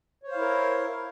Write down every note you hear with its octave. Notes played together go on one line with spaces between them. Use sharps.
E4 A#4 C5 C#5 F5